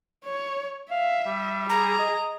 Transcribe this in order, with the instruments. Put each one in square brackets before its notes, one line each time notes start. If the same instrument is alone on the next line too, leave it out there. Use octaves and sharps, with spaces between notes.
[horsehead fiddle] C#5
[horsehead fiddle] E5 [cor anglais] F5
[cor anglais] G3
[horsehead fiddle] G#4 [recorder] A#5
[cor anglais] D#5